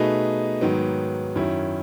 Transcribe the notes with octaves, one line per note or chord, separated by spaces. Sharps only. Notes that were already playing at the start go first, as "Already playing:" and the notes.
Already playing: B2 A3 D#4 G#4 B4
G#2 D#3 F#3 B3
F#2 D#3 F#3 C#4 E4